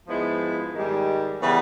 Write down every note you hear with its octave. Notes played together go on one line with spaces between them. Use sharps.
G#2 F3 G#3 B3 E4
G#2 D#3 G3
C#3 E3 G3 B3